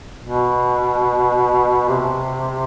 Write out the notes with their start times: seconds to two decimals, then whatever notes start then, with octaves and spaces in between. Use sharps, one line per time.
0.23 B2
1.89 C3